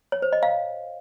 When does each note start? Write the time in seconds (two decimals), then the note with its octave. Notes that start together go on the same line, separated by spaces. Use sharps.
0.12 C#5
0.22 C5
0.33 D#5
0.43 F5